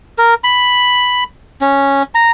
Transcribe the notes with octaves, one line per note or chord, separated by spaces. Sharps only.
A#4
B5
C#4
A#5